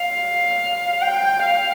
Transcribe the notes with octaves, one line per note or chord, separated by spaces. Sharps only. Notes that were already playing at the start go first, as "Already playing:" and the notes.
Already playing: F5
G5
F5